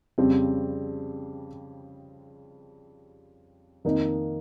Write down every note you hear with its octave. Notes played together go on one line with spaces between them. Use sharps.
F2 C#3 G3 C4
F2 D#3 A#3 D#4